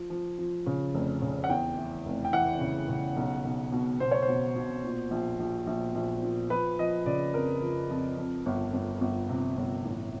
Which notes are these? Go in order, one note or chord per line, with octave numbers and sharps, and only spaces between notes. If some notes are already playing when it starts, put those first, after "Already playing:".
Already playing: F3
F3
F3
C#3
F1
C#3
F#5
E2 G5
E3
F1
G5
E3 F#5
C#3
C#3
B1
B1
B2
B2 C5
C#5
C5
B2
B2
A#2
A#1
A#1
A#1
A#1
A#2
F3 B4
F3 D#5
C#3 D5
F2 A#4
F3
F2
F2
G1
G1
G1
C3
G1
A1